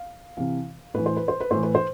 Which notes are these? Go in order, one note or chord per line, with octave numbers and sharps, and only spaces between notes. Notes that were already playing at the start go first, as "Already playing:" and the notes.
Already playing: F5
C3 E3 F5
A2 E3 B4
C5
B4
C5
B4
A2 E3 C5
B4
C5